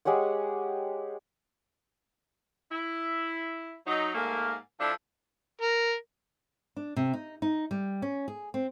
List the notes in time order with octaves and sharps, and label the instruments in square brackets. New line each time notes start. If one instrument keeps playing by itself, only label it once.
[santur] G#3 G4 C#5 F#5
[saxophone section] E4
F#3 D#4
G#2 A3 A#3
F3 D4 E4 F4 A4
[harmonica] A#4
[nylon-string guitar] D4
C3
D#4
D#4
G3
C#4
G#4
C4